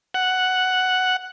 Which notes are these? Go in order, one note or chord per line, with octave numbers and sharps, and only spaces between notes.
F#5